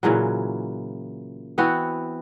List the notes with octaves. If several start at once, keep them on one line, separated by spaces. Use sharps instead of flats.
A#2 C#3 E3 F#3
E3 B3 C4 F#4